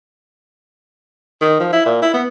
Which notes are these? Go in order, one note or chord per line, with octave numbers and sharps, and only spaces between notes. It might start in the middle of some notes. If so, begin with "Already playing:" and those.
D#3
F3
E4
A#2
E4
B3